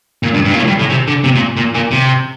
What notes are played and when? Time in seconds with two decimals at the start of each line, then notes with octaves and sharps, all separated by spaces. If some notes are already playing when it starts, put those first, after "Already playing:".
0.23 A#2
0.34 G2
0.45 G2
0.52 A#2
0.57 A2
0.68 G2
0.79 A2
0.90 C3
1.07 D3
1.24 C3
1.35 A#2
1.57 A#2
1.75 A#2
1.91 C3